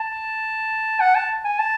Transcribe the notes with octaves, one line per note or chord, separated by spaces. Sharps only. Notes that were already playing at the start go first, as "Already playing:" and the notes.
Already playing: A5
F#5
A5
G#5
A5